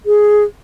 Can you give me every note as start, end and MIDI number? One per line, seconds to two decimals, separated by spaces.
0.06 0.44 68